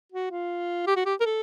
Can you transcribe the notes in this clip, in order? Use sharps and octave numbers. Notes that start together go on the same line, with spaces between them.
F#4
F4
G4
F#4
G4
A#4
A4